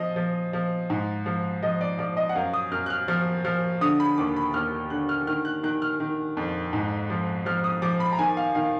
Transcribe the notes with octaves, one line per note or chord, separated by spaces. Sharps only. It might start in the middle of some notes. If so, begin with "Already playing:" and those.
Already playing: F3 D#5
F3
F3
G#2
F3
F3 D#5
D5
F3 D5
D#5
F#5
F#2 F5
D#6
F#2 F6
F#6
F6
F3 F6
F3 F6
D3 D#6
B5
D#2 D6
B5
D#2 F6
D3 F#6
F6
D#3 F6
F#6
D#3 F#6
F6
D#3
F2
G#2
F3
F3 F6
D#6
F3 D6
B5
A#5
D#3 G#5
F5
D#3 F5